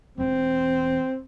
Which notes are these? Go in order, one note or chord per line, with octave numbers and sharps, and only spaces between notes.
E1 E2 C4